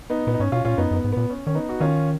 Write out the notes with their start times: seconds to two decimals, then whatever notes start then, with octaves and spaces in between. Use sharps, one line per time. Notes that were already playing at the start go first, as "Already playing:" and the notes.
0.10 B3 D#4
0.27 A#2 B3
0.34 D#4
0.40 G#2 C#4
0.52 B2 C#4 F4
0.65 A#2 C#4 F4
0.78 F#2 B3 D#4
0.91 F#2 B3
1.04 G#2
1.12 A#2 B3
1.30 C#4
1.47 D#3 C#4
1.55 B3 D#4
1.69 F#4
1.80 D#3 C#4 F4